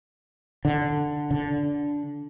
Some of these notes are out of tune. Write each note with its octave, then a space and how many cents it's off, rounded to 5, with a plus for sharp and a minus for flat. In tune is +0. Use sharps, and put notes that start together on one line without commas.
D3 +5
D3 -15